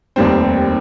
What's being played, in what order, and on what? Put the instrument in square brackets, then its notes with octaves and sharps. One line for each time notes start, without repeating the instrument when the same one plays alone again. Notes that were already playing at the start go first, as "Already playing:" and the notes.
[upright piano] F1 D#2 D#3 G3 C4